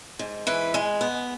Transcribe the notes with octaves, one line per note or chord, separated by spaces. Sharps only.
G#2
E3 B4
G#3
B3